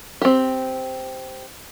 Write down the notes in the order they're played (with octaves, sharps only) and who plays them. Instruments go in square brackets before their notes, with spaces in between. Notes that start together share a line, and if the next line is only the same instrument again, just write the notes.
[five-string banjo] C4 G4